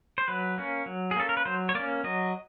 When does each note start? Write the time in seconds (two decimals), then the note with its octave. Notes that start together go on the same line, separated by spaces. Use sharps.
0.18 C5
0.28 F#3 B4
0.58 A#3 C#4
0.86 F#3
1.11 G#4
1.16 A#3 C#4 A4
1.29 A#4
1.37 B4
1.45 F#3 C5
1.69 C#5
1.75 A#3 D5
1.79 C#4
2.04 F#3 D#5